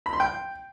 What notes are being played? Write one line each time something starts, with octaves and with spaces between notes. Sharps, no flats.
B5
C6
G5